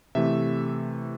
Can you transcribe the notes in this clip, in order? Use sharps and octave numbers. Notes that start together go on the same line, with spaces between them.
C3 E3 A3 E5